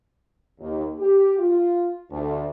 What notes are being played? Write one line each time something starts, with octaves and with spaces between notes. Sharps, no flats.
D#2
G4
F4
D2